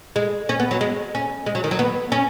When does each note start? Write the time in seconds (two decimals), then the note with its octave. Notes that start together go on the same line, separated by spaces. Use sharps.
0.16 G#3
0.49 C#4
0.60 B3
0.71 F#3
0.81 G#3
1.15 C#4
1.46 G#3
1.55 F#3
1.64 D#3
1.71 F#3
1.79 B3
2.12 C#4